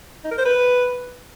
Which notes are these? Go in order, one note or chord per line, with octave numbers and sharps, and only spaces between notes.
D#4
A#4
C5
B4